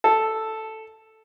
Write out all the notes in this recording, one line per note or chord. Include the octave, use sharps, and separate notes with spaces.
A4